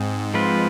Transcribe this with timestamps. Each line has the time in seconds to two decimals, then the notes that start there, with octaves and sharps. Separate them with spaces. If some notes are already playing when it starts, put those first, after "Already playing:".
Already playing: G#2 C4 G#4
0.34 F3 G#3 C4 F4 B4